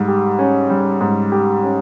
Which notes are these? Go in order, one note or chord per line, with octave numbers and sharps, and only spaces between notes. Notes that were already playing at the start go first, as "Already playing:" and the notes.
Already playing: G#2 G3
G4
C#4
G3
G#2
G4
C#4